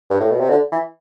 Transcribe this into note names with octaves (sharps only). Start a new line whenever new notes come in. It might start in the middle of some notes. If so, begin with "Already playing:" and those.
G2
A2
B2
C3
D3
E3